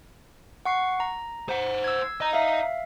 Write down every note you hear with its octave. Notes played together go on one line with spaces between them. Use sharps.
F#5 C#6 C7
A#5
C5 F#5
E6 G#6
D#5 A#5
E5 F5